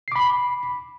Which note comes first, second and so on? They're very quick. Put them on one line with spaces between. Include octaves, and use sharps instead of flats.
C7 D6 B5